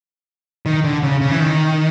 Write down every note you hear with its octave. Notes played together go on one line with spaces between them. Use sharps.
D#3
D3
C#3
C#3
E3
D#3